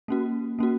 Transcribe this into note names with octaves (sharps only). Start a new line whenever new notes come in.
A#3 C#4 F#4
A#3 C#4 F#4